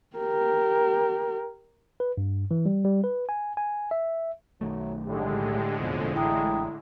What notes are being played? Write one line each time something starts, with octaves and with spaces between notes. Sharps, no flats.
G4 A#4
B4
G2
E3
G3
G3
B4
G#5
G#5
E5
B1 D#3 F#3 A3
A2 D3 G#3 G4
E1 F2 B2 F3
A1 E4 G5 A#5 D#6